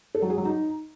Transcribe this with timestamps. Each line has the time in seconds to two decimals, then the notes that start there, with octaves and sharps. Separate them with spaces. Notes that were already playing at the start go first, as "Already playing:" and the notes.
0.15 A4
0.22 F#3
0.30 G#4
0.38 F#3
0.45 D#4